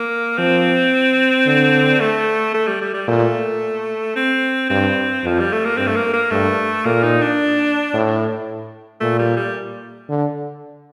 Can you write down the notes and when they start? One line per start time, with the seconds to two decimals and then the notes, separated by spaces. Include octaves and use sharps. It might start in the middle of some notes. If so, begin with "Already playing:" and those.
Already playing: A#3
0.38 F3 C4
1.46 D3
2.00 A3
2.54 A3
2.67 G3
2.81 G3
2.94 G3
3.08 A#2 A3
4.16 C4
4.69 G2 C4
5.24 F2 F3
5.39 G3
5.52 A3
5.65 A#3
5.77 G2 C4
5.87 A3
5.96 A#3
6.13 A#3
6.31 G2 A3
6.85 A#2 A#3
7.03 D#4
7.22 D4
7.93 A2
9.01 A#2 A3
9.19 G3
9.37 G3
10.09 D3